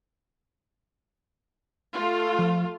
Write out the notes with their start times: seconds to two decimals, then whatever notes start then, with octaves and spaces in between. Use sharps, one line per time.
1.93 A3 F4
2.39 F3